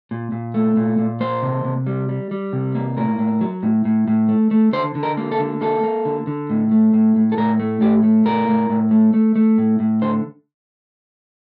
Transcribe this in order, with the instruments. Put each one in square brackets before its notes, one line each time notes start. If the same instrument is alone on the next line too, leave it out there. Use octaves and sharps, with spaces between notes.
[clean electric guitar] A#2
A#2
A3
A#2
A#2
A#3 C5
C3
C3
G3
G3
G3
C3
A#3
A2 A#4
A2
F#3
A2
A2
A2
A3
A3
D3 C5
D3
A#4
A#3
A4
D3
A#3 A4
A#3
D3
D3
A2
A3
A2
A2
A4
A2 A#4
A3
A2 G4
A3
A2 A#4
A2
A2
A3
A3
A3
A2
A2
D3 C5